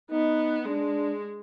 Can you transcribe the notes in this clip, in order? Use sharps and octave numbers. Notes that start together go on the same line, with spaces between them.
B3 D#4
G#3 D4